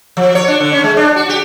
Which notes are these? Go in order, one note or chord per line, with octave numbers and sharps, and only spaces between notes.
F3
C#5
D4
D3
C#4
G#3
D4
F#4
G4